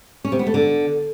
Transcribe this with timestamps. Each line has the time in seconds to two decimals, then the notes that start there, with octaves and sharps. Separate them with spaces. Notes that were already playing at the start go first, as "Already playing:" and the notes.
0.25 C#4
0.32 C3
0.39 B3
0.47 A3
0.54 D3